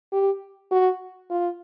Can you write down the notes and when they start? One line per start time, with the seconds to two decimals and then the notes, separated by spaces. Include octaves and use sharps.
0.13 G4
0.72 F#4
1.31 F4